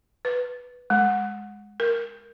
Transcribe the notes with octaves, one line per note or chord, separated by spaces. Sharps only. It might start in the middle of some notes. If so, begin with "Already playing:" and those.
B4
G#3
A#4